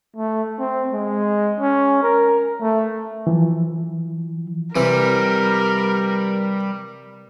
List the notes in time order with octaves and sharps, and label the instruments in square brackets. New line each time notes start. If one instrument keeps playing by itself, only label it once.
[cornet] A3
C4
G#3
C#4
A#4
A3
[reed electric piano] E3 F3
[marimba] C3 C4 [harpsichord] E3 [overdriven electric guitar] G3 [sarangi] A#4